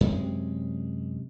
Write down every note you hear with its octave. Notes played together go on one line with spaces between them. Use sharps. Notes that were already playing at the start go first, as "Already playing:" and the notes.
F#2 C3 G#3